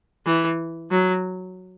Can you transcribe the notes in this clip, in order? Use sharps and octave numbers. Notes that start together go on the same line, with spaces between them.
E3
F#3